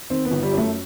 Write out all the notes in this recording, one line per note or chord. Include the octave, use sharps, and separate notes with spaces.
D#3 C4
B3
G1
G3
F#2
A3